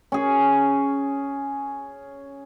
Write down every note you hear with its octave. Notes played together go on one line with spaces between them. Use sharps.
C#4 G#4